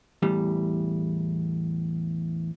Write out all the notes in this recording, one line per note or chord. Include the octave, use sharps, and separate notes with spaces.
E2 A2 G3